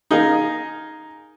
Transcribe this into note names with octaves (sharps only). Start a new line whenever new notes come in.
D#4 G#4 A#4 F5